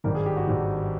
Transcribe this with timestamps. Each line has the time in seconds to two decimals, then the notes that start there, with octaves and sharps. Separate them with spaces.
0.04 G#1 G2 D#3 A#4
0.15 G#4
0.26 G4
0.37 F#4
0.47 G#1 G2 D#3